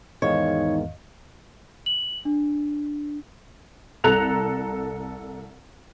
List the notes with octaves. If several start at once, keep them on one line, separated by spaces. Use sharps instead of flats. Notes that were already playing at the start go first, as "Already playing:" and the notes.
E2 G#2 D#3 D#4 C#5 D#5 F5
F#7
D4
C2 A4 A#5 F#6 F7